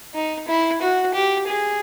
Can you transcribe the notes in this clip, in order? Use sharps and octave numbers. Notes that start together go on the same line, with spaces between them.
D#4
E4
F#4
G4
G#4